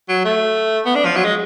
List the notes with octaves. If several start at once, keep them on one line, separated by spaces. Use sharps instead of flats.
F#3
A3
B3
D4
F3
F#3
G#3